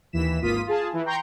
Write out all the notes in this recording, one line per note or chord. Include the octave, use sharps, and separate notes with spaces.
D#2 E3 B6 E7
G#1 A#3 F4 D#6 B6 D#7
F4 G#4 A5
E3
G5 A#5 C6 C#6 G6